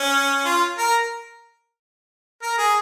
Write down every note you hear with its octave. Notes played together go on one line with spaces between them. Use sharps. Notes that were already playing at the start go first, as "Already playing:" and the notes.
Already playing: C#4
F4
A#4
A#4
G#4